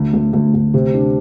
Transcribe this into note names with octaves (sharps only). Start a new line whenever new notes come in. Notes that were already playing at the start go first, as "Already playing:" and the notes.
Already playing: D2
D2
D2
D2
C3
D4